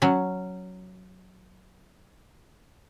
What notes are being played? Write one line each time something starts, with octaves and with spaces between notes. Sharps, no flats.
F#3 C#4